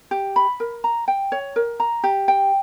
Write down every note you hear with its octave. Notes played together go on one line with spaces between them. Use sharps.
G4
B5
A#4
A#5
G5
C#5
A#4
A#5
G4
G5